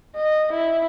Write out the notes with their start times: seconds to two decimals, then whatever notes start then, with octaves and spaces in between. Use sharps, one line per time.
0.16 D#5
0.53 E4